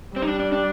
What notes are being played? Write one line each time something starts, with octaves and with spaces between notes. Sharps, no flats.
G3 C4
D#4
D4
D4
D4